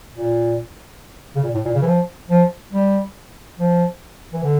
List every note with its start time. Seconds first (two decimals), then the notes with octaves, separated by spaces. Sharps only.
0.15 A#2
1.35 C#3
1.43 A#2
1.54 A2
1.65 A#2
1.75 C#3
1.82 E3
1.87 F3
2.30 F3
2.73 G3
3.59 F3
4.33 E3
4.43 D3